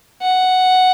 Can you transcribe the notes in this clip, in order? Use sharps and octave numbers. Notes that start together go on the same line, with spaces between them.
F#5